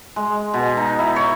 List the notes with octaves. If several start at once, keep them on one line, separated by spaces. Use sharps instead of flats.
G#3
B2
D#4
E4
C#5